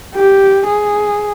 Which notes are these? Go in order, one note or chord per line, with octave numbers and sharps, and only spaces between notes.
G4
G#4